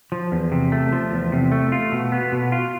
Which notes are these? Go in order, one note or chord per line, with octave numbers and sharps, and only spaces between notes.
F3
E2
C3
A3
F3
E2
C3
A3
F4
B2
B3
B2
F4